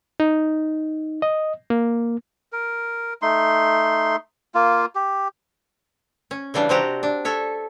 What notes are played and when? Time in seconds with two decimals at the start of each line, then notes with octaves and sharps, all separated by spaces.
0.20 D#4
1.22 D#5
1.70 A#3
2.52 A#4
3.22 A3 D#4 C6
4.54 A#3 F4
4.95 G4
6.31 C#4
6.54 C#3 E3 G3 D4
6.69 C3 C4 F#4 G4 A#5
7.03 D4
7.25 A4 C#5 E5